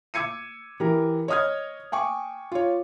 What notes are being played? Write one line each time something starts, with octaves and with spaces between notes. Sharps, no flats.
D6 E6 G#6 C#7 D#7
E3 G4 A#4
C#5 D#5 D#6 F6 G#6
G5 G#5 C#6 D6
F4 C#5